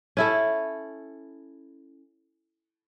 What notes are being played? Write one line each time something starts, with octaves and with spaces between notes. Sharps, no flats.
C#4 E4 A4